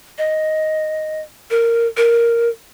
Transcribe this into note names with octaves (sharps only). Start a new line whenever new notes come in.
D#5
A#4
A#4